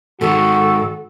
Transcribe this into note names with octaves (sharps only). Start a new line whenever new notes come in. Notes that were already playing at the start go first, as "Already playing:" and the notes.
G#2 D#3 F#4 A4